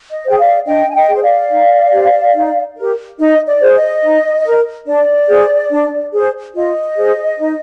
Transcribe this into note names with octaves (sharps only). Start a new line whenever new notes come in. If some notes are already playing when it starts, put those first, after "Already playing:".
D#5
G#4 C5 G5
D5 F5
D4 D#5 G5
G#5
D#5 G5
G#4
C5
D5 F5
D#4
G4 C5
D#4
G4 A#4
D#4 D#5
D5
G#4 C5
D#5
D#4
A#4
D4 D5
G#4 C5
D4
G#4 C5
F4 D#5
G#4 C5
D#4